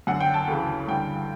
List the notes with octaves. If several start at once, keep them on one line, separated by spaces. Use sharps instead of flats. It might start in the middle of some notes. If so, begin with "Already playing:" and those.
F#2 D3 F#5
G5
A5
D2 C#3 E3
G2 D3 G5